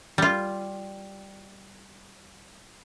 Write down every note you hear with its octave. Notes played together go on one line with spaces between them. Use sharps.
G3 F4